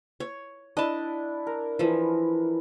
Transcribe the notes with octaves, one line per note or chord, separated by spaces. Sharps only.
C#5
D4 E4 D#5 A5
A#4
E3 F3